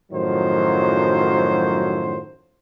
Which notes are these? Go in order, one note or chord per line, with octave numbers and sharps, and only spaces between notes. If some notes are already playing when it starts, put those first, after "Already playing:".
F#2 A2 D#3 F3 F#3 C5